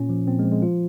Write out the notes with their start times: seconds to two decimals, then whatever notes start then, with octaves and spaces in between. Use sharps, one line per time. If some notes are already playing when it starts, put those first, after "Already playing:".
Already playing: A#2 C#4
0.09 F3
0.27 A#2 C4
0.39 G#3
0.45 F3
0.52 G#3
0.62 F3 F4